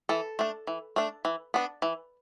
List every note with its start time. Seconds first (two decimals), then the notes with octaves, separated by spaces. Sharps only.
0.09 E3 A4
0.39 A3 D4
0.67 E3
0.96 A3 D4
1.25 E3
1.54 B3 D4
1.82 E3